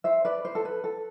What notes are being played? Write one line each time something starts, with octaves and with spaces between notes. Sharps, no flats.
C5 E5
B4 D5
C5
A4
B4
A4